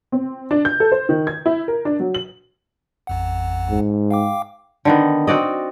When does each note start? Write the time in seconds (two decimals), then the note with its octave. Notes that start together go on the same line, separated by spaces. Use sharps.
0.12 C4
0.51 D4
0.65 G6
0.80 A4
0.92 C5
1.09 D#3
1.27 G#6
1.46 E4
1.68 A#4
1.85 D4
2.00 F#3
2.14 F#7
3.07 A1 F2 F#5
3.70 G#2
4.11 F5 G5 D6
4.85 D3 D#3 B3
5.27 C4 F#4 D5 D#5